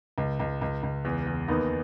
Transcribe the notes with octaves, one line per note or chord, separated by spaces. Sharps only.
C#2
C#2
C#2
C#2
E2
E2
D#2 B3 D#4